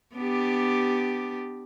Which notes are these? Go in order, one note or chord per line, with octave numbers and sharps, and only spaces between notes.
B3 D4 G4